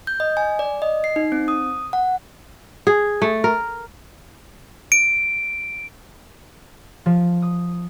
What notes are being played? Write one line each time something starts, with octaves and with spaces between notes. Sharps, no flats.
G6
D#5
G#5
D5
D#5
C7
D#4
C4
D#6
F#5
G#4
A3
A#4
D7
F3
D#6